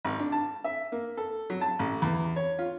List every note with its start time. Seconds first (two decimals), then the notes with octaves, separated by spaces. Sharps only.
0.05 G#1
0.19 D4
0.32 A5
0.64 E5
0.92 A#3
1.17 A4
1.50 F#3
1.61 A5
1.79 A1
2.02 E2
2.36 C#5
2.59 F4